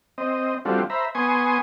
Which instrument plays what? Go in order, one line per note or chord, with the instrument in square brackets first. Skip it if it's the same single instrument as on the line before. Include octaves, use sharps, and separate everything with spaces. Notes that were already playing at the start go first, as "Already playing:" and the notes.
[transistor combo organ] C4 D#5
G3 A3 C4 D4 F4 F#4
C5 E5 A#5 B5
B3 G#5 C6 C#6 D#6